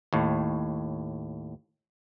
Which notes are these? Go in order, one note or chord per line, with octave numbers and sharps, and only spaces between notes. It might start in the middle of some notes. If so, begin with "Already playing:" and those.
D#2 A2